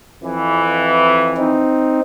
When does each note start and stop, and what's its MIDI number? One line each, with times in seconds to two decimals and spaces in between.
0.23 1.66 41
0.23 1.66 52
1.38 2.01 60
1.38 2.01 63